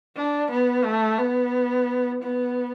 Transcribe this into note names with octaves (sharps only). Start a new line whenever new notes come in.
D4
B3
A3
B3
B3